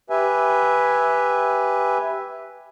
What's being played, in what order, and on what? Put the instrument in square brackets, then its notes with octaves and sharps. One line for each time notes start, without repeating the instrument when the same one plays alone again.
[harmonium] G4 B4 E5 G#5